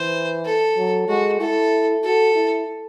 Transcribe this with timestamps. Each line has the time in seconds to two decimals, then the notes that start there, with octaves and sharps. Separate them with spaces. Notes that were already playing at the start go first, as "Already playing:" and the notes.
Already playing: E3 C5
0.45 A4
0.77 F#3
1.08 G#3 F#4
1.40 E4 A4
2.04 F#4 A4
2.35 E4